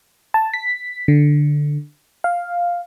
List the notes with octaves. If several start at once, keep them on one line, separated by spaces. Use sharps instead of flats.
A5
B6
D3
F5